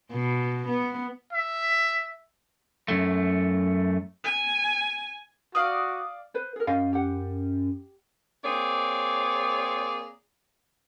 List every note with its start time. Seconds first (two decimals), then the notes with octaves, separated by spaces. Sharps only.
0.12 B2
0.69 B3
1.33 E5
2.88 F#2 A3
4.24 G#5
5.55 F#4 D5 F5 D#6
6.34 B4 C5
6.56 G#4 A#4
6.67 F#2 F#4 D#5 F5
6.93 G4 F#5
8.44 A#3 C4 G#4 C#5 D5